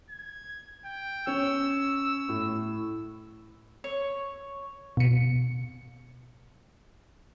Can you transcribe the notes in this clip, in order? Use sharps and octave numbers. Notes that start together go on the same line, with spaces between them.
G#6
G5
C#4 E6
A2
C#5
B2 C#7